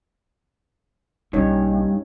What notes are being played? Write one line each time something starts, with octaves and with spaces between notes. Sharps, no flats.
B1 G2 A#3 C#4 D#4 C#5